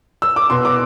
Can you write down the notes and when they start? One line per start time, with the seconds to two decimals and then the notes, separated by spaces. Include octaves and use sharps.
0.22 E6
0.36 D6
0.50 B2 C6
0.65 D6